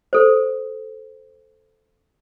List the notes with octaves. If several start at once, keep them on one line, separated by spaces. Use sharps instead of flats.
A4 C5